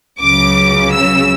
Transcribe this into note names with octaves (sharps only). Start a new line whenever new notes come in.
C#2 C#3 F#3 D6
E6